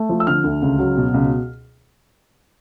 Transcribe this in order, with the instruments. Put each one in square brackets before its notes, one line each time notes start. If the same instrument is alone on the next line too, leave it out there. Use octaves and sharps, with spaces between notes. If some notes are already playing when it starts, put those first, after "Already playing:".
Already playing: [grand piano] A3
F3
E6
D3 F6
D2
C#2
F#3
B2
C#2